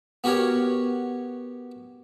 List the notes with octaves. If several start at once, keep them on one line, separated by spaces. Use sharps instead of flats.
B3 F#4 G4 A#4 C#5